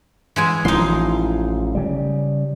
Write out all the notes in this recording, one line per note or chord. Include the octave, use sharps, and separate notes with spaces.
E3 G#3 G#5
A1 E3 F3 D#4 C6
C#3 G3